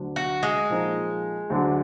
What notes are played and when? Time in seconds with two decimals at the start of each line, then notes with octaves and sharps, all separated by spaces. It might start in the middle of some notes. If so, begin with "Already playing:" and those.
Already playing: D2 D3 F#3 D4
0.16 F#4
0.43 G#3
0.70 A#2 F3 A#3 D#4
1.50 D2 D3 F#3 D4